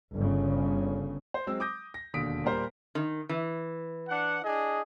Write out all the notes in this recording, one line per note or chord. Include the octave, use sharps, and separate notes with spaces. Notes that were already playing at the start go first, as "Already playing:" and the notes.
G1 C#3
C5
F#3 G#3 C4 E6
D6 D#6 G6 A#6
A#6
E1 D#2 D3 D#6 B6 D7
A#2 G3 A#4 C5
D#3
E3
D4 F#5
D4 G#4 D#5